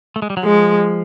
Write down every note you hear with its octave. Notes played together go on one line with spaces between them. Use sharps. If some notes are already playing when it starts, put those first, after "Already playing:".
A3
G#3
G3
F#3
F3 G#3